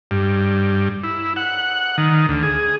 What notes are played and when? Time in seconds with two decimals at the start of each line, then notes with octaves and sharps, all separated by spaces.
0.11 G2
1.04 E4
1.36 F#5
1.98 D#3
2.29 D2
2.43 G#4